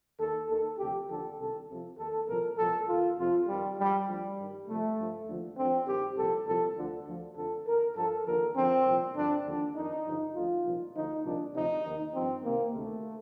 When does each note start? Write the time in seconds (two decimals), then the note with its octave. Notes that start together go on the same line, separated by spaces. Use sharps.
0.19 D#2 D#3 A4
0.49 D#2 D#3 A4
0.79 D2 C3 F3 G4
1.09 D#2 D3 F3 A4
1.39 C2 C3 D#3 A4
1.69 C2 C3 F3
1.98 D#2 D#3 A4
2.28 C2 A#2 F3 A#4
2.58 C2 A#2 F3 A4
2.88 D#2 D#3 F4
3.18 F2 C3 F3 F4
3.48 F2 D#3 G3
3.78 G2 F3 G3
4.07 D2 D3 F3 G3
4.37 G2 D#3
4.67 C2 C3 F3 A3
4.97 G2 F3
5.27 D#2 D3 F3
5.57 D2 D3 F3 C4
5.87 G2 D#3 G4
6.17 C2 A#2 F3 A4
6.46 C2 A#2 F3 A4
6.76 D2 D3 F3
7.06 D2 D3 F3
7.36 F2 D3 F3 A4
7.66 D#2 D#3 A#4
7.96 G2 F3 A4
8.26 D#2 D3 F3 A#4
8.55 F2 D3 F3 C4
8.86 C2 A#2 F3
9.15 G2 D3 F3 D4
9.45 D#2 D3 F3 D4
9.75 F2 D#3 D#4
10.05 G2 D3 F3
10.35 D2 D3 F3 F4
10.65 C2 A#2 F3
10.95 D2 D3 F3 D#4
11.24 C2 A#2 F3 D4
11.55 D2 C3 F3 D#4
11.84 D#2 D#3
12.14 G2 F3 C4
12.44 C2 C3 D#3 A#3
12.74 D2 C3 D#3 A3